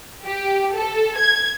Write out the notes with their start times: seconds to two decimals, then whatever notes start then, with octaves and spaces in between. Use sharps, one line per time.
0.24 G4
0.74 A4
1.17 G#6